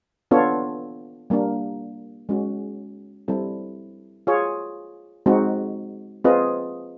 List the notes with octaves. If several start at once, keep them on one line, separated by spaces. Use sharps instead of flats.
B3 D4 F4 A4 C#5
G3 A#3 D4
G#3 C#4 F#4
G3 C4 E4 A4
F4 G#4 C#5
G#3 C4 D#4 F#4
C4 F4 G#4 B4 D#5